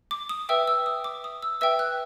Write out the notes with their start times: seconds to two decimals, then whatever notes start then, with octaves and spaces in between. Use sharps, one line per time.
0.11 D6
0.29 D#6
0.49 B4 E5 G5 E6
0.67 E6
0.86 D#6
1.04 D6
1.24 D#6
1.42 E6
1.61 B4 E5 G5 E6
1.79 F#6